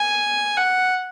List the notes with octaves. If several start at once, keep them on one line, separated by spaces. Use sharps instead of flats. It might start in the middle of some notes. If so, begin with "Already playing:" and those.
Already playing: G#5
F#5